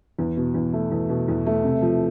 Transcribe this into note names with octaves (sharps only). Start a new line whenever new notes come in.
E2
B2
E2
A3
E2
B2
E2
A3
C3
F3